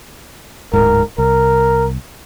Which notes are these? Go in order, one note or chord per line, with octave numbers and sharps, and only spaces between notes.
D1 G#2 A#4
C2 A#4